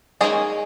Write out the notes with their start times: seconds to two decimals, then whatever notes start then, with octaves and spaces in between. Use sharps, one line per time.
0.21 D#3 F#3 G#3 A#3 C#4 G#4